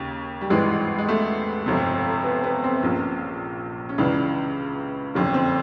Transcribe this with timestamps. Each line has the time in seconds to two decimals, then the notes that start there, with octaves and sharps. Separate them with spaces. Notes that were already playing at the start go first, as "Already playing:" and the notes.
Already playing: D#2 C#3
0.41 G3
0.50 G#1 G2 E3 G#3
0.98 G#3
1.09 A3
1.66 G1 F2 C3
2.24 B3
2.44 B3
2.64 C4
2.82 A#1 A#2 C#4
3.89 C#4
3.98 C#2 C#3 E3 D4
5.14 F#1 F2 D3 C#4
5.34 C4